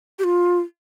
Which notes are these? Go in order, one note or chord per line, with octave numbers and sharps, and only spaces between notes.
G4
F4